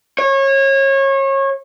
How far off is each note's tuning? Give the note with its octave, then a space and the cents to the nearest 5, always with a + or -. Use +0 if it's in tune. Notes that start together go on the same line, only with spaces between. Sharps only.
C#5 -30